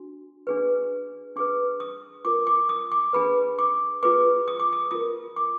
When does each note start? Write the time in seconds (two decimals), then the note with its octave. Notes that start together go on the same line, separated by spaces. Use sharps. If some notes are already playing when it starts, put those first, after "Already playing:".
Already playing: D4 F#4
0.47 D4 G#4 B4
1.36 D4 G#4 B4 D6
1.80 D#6
2.25 F4 A#4 D6
2.47 D6
2.69 D#6
2.92 D6
3.13 D4 G#4 B4 B5
3.59 D6
4.03 F4 G#4 B4 D6
4.48 D#6
4.60 D6
4.73 D#6
4.91 F4 A#4 D#6
5.36 D6